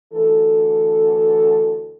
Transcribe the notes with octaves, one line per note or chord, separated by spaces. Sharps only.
D2 E3 A4